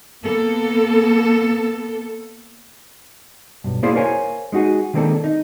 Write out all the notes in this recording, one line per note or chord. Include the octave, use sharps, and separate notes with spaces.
A#3 B3 A4
B1 G2
A#3 E4 G#4 C5 D5 F5
A#4 C5 C#5 F5 G#5
G#3 D#4 F#4 G#4
D#3 G#3 A#3 C4 D4 A4
D#4